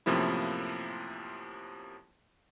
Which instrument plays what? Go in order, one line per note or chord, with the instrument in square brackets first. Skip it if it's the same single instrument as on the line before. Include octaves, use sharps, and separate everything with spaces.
[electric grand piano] F#2 A2 C3 F3 A#3 E4